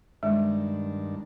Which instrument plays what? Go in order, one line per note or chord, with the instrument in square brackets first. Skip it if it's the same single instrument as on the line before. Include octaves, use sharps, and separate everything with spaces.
[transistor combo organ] G2 D#3 D4 [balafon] G#3